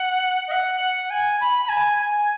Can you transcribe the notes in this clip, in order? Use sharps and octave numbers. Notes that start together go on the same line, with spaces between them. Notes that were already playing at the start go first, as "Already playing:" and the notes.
Already playing: F#5
D#5
F#5
F#5
G#5
B5
B5
G#5
G#5